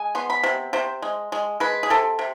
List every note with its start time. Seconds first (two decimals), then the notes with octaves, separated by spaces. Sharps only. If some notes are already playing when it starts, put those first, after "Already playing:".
Already playing: G#3 G#5
0.15 B3 C6
0.30 B5
0.43 C3
0.73 C3 C5
1.02 G#3
1.32 G#3
1.60 G#3 B4
1.83 G#4
1.90 C3 A4
2.19 C3